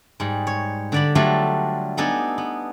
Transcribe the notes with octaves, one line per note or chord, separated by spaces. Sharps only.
G#2 G3
C#5
D3 D5 B5
F#3 G3 A3 D4 F4
B3 D4 D#4 G#4 A4
B3